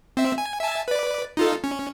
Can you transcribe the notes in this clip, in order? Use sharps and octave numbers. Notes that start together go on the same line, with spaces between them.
C4 E5
G#5
E5 G#5 A5
B4 D5
D#4 F4 A4
C#4